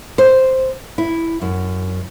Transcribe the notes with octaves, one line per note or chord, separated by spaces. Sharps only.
C5
E4
F#2